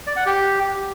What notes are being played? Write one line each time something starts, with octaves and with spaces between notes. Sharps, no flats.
D5
F#5
G4